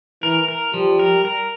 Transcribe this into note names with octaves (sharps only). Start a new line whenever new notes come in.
E3 A#4
A#4
F3 G3
A#4
A#4